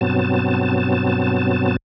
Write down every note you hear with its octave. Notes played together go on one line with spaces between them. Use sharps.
G2 B2 F#3 B3 C4 A5